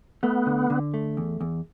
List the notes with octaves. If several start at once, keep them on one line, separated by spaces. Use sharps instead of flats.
A3 B3
D3
D3
A3
E2
E2